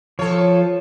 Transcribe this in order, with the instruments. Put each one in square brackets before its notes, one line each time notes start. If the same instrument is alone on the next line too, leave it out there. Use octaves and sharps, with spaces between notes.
[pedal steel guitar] F3 [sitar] A4 C#5